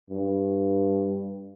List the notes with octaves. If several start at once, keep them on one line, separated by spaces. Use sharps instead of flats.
G2